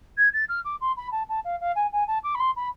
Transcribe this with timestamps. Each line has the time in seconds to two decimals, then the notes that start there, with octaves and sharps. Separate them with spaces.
0.17 G#6
0.33 A6
0.48 F6
0.64 D6
0.81 C6
0.96 B5
1.12 A5
1.29 A5
1.44 F5
1.60 F5
1.75 G#5
1.92 G#5
2.07 A5
2.23 D6
2.34 B5
2.39 C6
2.56 B5